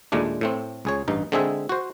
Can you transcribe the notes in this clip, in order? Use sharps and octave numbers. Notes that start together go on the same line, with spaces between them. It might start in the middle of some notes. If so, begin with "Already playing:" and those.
D#2 A#2 G#3 A3 D4
A2 A3 C4
C#2 G#4 C#5
A1 G2 D#4
D3 G#3 C4 D#4 G#4 E5
F#4 C5